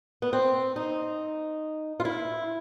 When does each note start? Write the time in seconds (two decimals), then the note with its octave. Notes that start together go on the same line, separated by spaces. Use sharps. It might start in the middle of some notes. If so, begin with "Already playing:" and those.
0.22 B3
0.33 C4
0.76 D#4
2.00 F4
2.05 E4